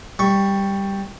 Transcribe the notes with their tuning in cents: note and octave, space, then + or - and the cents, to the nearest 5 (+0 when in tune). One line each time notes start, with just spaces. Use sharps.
G3 +5 C#6 +0